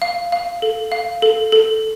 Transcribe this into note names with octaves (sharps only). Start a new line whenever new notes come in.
F5
F5
A4
F5
A4
A4